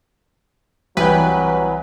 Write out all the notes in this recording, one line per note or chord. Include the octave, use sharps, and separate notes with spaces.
C2 E3 F#3 B4 G5 G#5